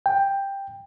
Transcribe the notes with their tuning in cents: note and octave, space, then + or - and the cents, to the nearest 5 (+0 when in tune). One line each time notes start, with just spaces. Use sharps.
G5 +10